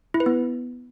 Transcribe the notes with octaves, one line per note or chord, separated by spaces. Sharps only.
E4
B4
B3